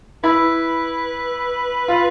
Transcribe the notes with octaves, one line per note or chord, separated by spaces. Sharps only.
E4 B4
F4